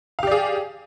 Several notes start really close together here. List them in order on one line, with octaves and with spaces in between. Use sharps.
F5 G4 D5 G#4